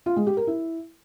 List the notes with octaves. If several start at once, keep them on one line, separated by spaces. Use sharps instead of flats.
F4
G#3
G4
A#4
E4